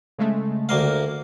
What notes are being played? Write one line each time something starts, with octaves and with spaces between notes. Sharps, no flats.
C#3 G#3 A3
D2 A#3 F5